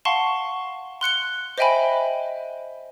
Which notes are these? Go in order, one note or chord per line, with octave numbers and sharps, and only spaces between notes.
F5 F#5 A5 C6 C#6
C6 F#6 C#7 G7
C5 D#5 E5 G5 G#5 B5